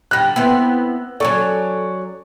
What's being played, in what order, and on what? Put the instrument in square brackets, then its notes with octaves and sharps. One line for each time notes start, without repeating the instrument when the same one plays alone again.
[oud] D3 G3 [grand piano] F#6 A#6
[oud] B3 C4 E4 [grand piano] E6
[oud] F#3 C#4 A4 [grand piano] D5 C#6